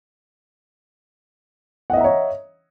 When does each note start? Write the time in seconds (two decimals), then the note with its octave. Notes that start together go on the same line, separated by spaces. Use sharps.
1.90 F#5
1.93 D#5
1.97 E5
2.01 A#5
2.04 C#5